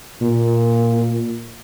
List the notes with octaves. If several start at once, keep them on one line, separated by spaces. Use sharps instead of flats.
A#2